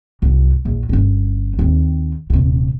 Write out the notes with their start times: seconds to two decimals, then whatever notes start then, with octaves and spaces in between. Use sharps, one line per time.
0.22 C2 F#2
0.65 A#1 E2
0.89 G1 C#4
1.59 D#2 C4
2.30 D#1 C3